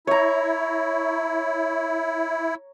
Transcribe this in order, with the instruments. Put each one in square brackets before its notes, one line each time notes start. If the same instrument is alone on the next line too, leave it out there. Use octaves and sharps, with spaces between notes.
[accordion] E4 [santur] C#5 A#5